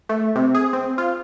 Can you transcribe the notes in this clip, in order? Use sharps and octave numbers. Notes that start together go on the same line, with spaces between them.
A3
C3
G#4
C4
F4